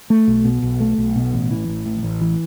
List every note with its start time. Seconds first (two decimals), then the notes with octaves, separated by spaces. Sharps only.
0.10 A3
0.28 B1
0.45 B2
0.63 B1
0.80 A3
0.98 B1
1.16 B2
1.33 A1
1.51 E3
1.68 A1
1.86 A2
2.03 A1
2.21 E3